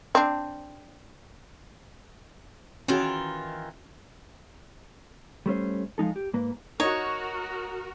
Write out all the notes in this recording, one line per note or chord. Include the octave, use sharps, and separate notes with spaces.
C4 D4
D#3 E3 C#4 F4 F#4 G#4
G3 A3 C#4 C5
F3 G#3 D#4 A4
G4
G#2 A#3 B4
D#4 F#4 A#4 C#5